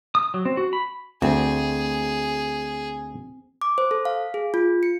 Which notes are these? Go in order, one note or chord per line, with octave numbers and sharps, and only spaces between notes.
D#6
F#3
C4
F#4
B5
D2 C4 G#4
D6
C5
A4
F5
G#4
F4
C#7